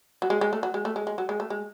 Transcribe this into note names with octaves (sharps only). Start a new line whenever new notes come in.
F#3
G#3
G#3
A3
F#3
G#3
A3
G#3
G#3
F#3
G#3
A3
G#3